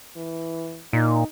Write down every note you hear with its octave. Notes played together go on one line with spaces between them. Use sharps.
E3
A#2 D#4